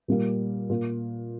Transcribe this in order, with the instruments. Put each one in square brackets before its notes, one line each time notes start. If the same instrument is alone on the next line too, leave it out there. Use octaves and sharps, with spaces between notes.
[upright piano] A#2 G3 A#3
A#2 A#3